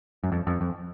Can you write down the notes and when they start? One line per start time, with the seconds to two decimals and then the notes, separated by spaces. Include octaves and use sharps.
0.24 F#2
0.32 F2
0.47 F2
0.61 F2